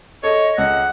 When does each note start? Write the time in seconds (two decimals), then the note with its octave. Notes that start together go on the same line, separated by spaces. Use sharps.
0.23 A4 C#5 D#5
0.58 C#2 F#5